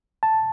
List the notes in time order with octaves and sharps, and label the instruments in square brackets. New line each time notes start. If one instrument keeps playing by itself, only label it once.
[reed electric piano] A5